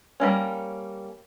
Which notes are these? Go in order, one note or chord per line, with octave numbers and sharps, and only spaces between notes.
G3 A#3 C#4